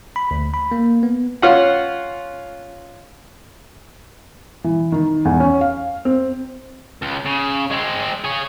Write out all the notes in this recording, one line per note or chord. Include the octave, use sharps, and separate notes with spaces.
B5
D2
B5
A#3
B3
C#4 F4 F#5
E3
D#3
E2
C#4
F5
C4
C#2
C#3
G#3 C4
C#4 G#4